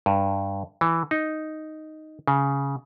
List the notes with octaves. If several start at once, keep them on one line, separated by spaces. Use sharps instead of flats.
G2
E3
D#4
C#3